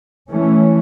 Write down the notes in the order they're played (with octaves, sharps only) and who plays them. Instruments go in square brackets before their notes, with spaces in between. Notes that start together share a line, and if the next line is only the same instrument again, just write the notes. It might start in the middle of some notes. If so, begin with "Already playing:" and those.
[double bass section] E3 A3 C#4